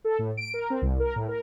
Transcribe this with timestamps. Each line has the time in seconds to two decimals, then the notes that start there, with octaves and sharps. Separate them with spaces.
0.05 A4
0.19 A2
0.37 D7
0.54 A#4
0.70 C4
0.82 C2
1.00 A#4
1.16 A2
1.28 A#4